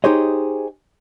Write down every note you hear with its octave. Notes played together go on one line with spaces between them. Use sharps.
D#4 G4 G#4 C5 C#5 D#5